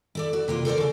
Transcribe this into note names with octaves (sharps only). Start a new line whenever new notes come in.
E4 A4 D5
F#4
C3 A#3 F4
A4 A#4 C5 D5
C#3 A4